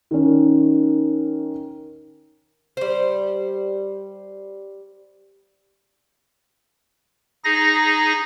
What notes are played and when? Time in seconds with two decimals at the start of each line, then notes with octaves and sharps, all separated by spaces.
0.11 D#3 C#4
2.77 G3 C5
7.44 D#4 G#4 A#6